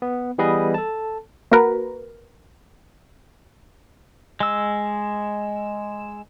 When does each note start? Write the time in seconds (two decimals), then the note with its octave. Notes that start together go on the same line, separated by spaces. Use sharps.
0.02 B3
0.38 E3 G3 B3 G#4 B4 D#5
0.74 A4 A5
1.51 A#3 F#4 A#4 B4
4.40 G#3 E6